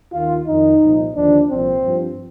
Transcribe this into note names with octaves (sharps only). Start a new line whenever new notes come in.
D#2 D#3 F4
F2 D#3 D#4
C2 A#2 F3
D#2 D3 F3 D4
C2 A#2 F3 C4
G2 F3